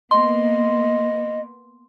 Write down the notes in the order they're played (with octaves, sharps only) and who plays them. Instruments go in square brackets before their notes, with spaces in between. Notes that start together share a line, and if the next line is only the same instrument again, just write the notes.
[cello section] A#3 B3 [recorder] D#5 [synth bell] C6